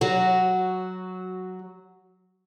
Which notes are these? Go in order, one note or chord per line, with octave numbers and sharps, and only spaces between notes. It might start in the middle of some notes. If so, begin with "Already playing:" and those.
F#3 F#4